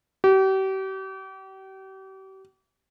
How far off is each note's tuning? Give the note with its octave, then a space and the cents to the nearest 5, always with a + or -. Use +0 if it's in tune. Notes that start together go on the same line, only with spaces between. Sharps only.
G4 -40